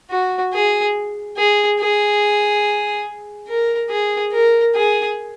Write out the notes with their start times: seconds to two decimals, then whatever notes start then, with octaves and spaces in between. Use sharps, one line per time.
0.11 F#4
0.54 G#4
1.37 G#4
1.80 G#4
3.48 A#4
3.90 G#4
4.32 A#4
4.75 G#4